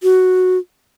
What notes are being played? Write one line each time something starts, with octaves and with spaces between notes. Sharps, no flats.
F#4